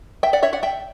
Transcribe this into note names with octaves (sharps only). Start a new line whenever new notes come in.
E5 G5
D5 F#5
C#5 E5
D5 F#5
E5 G5